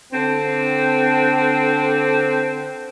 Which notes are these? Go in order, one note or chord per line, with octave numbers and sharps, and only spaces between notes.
D3 C4